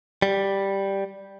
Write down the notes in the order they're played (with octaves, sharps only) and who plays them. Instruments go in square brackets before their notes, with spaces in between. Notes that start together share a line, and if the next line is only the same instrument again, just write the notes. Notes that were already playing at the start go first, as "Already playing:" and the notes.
[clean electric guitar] G3